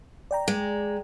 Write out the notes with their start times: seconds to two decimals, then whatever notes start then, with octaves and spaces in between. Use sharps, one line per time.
0.31 D5 G5 A#5
0.48 G#3